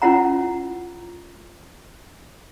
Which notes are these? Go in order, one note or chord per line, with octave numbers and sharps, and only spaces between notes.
C#4 E4 F4 F#5 A#5